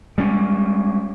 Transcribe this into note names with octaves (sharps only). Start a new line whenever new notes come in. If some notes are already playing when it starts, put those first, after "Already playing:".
G3 G#3 C#4